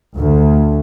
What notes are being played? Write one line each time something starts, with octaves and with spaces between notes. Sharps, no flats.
D2